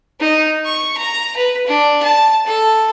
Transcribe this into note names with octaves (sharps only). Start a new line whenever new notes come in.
D#4
C#6
A#5
B4
D4
A5
A4